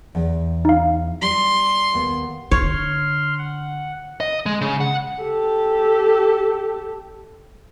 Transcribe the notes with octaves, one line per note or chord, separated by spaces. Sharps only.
E2
D#4 F5
G3 C6
D#2 B3
D3 C#5 C6 F6
F#5
D#5
G#3
C#3
F#5
G4 A4